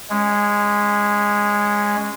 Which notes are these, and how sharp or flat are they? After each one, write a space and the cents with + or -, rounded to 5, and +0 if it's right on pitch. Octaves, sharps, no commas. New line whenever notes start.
G#3 -10 C#4 +0